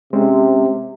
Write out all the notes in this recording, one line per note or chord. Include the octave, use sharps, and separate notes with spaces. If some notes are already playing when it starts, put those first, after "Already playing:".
C3 G#3 C4 C#4